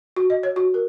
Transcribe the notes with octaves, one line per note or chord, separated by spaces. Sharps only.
F#4
D#5
C#5
F#4
A#4